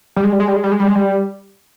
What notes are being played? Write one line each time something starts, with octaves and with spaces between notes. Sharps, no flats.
G3
G#3
G3
G#3
G3
G#3
G3
G#3
G3
G#3
G3